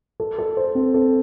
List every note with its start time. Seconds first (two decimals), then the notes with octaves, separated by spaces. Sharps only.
0.20 A4
0.38 A4
0.57 C5
0.75 C4
0.94 A4